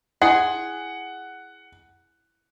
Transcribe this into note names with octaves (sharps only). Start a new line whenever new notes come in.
E4 G#4 F#5